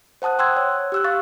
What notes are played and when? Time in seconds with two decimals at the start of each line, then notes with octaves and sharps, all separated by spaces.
0.22 C5 F#5 A5 D#6 F#6
0.39 G5 C6 E6 F#6 G#6
0.57 C#5
0.92 G4 E6 F#6
1.04 F5 C#6 A6